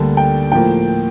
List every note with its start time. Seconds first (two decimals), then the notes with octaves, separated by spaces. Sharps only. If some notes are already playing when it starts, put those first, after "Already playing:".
Already playing: D2 D3 G3 A#3 A5
0.17 G5
0.52 A2 F3 A#3 G5